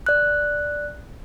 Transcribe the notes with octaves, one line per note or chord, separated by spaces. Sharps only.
D5 F#6